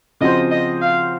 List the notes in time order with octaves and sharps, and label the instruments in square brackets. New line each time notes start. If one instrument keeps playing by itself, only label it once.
[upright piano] C#3 F3 C4 F#4 C5 [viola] D#5
[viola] D#5
F5